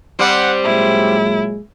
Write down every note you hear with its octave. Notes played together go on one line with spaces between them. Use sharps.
G3 C4 F#5
A#2 F#3 G#3 E4